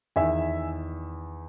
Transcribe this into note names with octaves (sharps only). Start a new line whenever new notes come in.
E2 D#3 E5 G#5